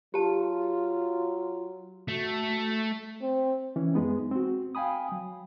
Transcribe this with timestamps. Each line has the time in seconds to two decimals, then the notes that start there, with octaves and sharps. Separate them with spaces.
0.14 F#3 F4 G4 A5
2.08 A3 F#4
3.21 C4
3.76 E3 C#4
3.94 F#2 G#3 B3 D#4
4.31 C4 F#4
4.75 F5 G5 G#5 B5 D#6
5.12 F#3